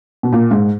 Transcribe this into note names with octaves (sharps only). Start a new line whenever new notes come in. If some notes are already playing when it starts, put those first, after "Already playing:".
B2
A#2
G#2